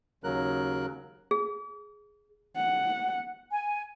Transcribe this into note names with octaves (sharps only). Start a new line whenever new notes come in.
D#2 C#3 F#3 A#4 F#6
G#4
F#5
G#5